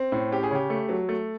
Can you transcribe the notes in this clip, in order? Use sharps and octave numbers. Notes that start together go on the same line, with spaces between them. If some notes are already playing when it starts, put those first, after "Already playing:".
Already playing: C4
A2
C#4 G4
G#4
C#3 G4
A3
F#3
A3